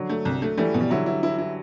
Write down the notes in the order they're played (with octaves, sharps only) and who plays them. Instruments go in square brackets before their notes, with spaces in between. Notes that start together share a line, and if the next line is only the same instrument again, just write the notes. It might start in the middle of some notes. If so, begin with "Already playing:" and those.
Already playing: [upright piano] D3 F#3
[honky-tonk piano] A3
C2
A3
[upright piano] E3 G3 [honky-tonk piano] A3
[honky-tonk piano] B2
[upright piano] G3
[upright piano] D3 F#3 [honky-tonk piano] E4
[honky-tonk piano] E4
E4
E4